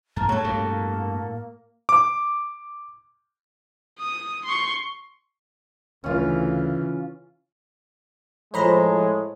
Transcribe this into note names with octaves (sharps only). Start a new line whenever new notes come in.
F#2 A#4 A5
A2 A3 F#4 A4 C#5
G2 B2 G3 A#3
D6
D#6
C6 C#6
D2 C#3 E3 C#4 F4
A2 F3 G#3 C5 A#5 B5